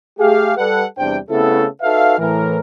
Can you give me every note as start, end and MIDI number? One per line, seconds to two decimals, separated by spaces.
0.19 0.54 57
0.19 0.54 67
0.19 0.54 68
0.19 0.54 77
0.57 0.84 55
0.57 0.84 69
0.57 0.84 71
0.57 0.84 78
0.98 1.17 40
0.98 1.17 48
0.98 1.17 55
0.98 1.17 62
0.98 1.17 72
0.98 1.17 79
1.30 1.66 49
1.30 1.66 57
1.30 1.66 59
1.30 1.66 60
1.30 1.66 64
1.30 1.66 69
1.82 2.15 63
1.82 2.15 66
1.82 2.15 69
1.82 2.15 71
1.82 2.15 76
1.82 2.15 77
2.18 2.60 45
2.18 2.60 52
2.18 2.60 70